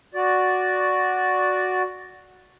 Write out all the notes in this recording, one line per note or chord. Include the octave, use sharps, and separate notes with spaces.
F#4 D5